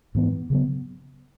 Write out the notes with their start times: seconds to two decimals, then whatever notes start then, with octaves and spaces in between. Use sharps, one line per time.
0.15 G#2 E3 B3
0.50 C#3 F#3 B3